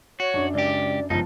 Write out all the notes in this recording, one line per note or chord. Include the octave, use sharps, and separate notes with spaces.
F#4 C#5
F#2 D4
C#2 G4 D5
G1 C#2 F3 D#4 A5